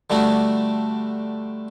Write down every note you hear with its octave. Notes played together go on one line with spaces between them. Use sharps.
D3 G3 A3 D4 F#4